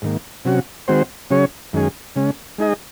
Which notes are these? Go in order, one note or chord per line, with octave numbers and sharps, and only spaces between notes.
G#2 D#3 A#3
C3 F#3 C#4 F#4
D#3 G#3 C4 F#4 C5
C#3 F#3 C#4 G#4 C#5
F#2 D#3 G#3 C#4 G#4
C#3 G#3 C#4
G#3 D#4 G#4 D#5